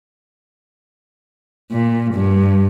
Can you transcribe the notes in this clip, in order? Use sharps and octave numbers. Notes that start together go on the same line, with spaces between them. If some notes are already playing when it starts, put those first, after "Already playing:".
A#2
G2